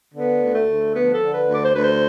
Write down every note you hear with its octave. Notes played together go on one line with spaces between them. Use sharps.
D3 B3
D2
A3
D2
F3 B3
A4
D3
B4
D2
D5
C5
D2 B4
C5